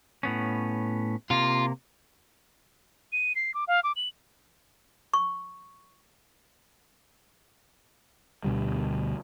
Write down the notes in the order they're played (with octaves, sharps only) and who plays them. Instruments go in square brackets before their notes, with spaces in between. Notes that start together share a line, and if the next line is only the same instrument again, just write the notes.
[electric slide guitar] A2 B3 C#4
[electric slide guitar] C3 A#3 [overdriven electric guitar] F4
[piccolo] D#7
C7
D6
F5
D6
F#7
[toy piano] C#6
[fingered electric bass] D2 B2 D3 G3